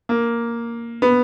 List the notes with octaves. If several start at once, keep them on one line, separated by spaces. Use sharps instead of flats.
A#3
B3